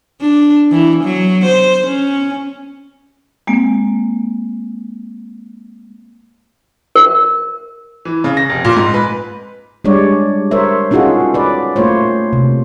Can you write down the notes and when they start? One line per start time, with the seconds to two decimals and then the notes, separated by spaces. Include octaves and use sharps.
0.21 D4
0.71 E3
1.04 F#3
1.46 C5
1.87 C#4
3.47 G#3 A#3 C4
6.96 A#4
8.05 E3
8.24 C#3
8.37 A#6
8.49 F1
8.65 A#2
8.76 G#2
8.94 B4
9.84 G3 G#3 D4 C#5 D5
10.51 A#4 C5 C#5 E5
10.91 C#4 D#4 F4 F#4 G#4 A4
11.34 B4 D5
11.76 A3 A#3 F4 C5 C#5
12.33 C3